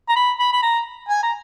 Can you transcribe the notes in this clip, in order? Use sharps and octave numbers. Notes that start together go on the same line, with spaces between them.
A#5
B5
B5
B5
A#5
G#5
A#5